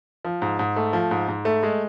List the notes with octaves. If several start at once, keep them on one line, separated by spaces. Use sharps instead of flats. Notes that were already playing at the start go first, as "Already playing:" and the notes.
F3
G#2
G#2
A3
F3
G#2
G#2
A3
G#3